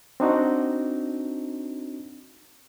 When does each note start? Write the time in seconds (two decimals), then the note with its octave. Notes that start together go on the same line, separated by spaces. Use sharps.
0.20 C4 D4 D#4 F#4